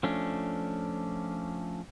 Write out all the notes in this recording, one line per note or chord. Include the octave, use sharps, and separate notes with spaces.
F3 A3 C#4 D4